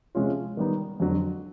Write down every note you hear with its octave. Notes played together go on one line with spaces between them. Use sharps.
C3 F3 G#3 C#4 F4
D#3 G3 B3 D#4
F2 D3 F#3